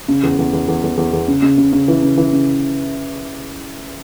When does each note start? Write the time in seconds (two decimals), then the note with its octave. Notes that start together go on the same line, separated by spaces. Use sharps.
0.08 C#3
0.23 E2
0.38 E2
0.53 E2
0.68 E2
0.83 E2
0.97 E2
1.13 E2
1.28 C#3
1.42 C#3
1.58 C#3
1.73 C#3
1.88 E3
2.02 C#3
2.17 E3
2.32 C#3